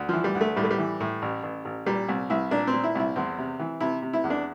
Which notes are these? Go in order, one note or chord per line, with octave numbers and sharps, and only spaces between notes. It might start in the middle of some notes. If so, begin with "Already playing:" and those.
Already playing: D2
E3 F3
G3
D2
A3
A2 G3
A3
G3
E3
A2
A1
A1
A1
A#2 G3
C2
C2 E4
A#2 D4
C4
A#2
E4
C2 E4
E2 C4
C3
E3
C3 E4
C3
E4
E2
D4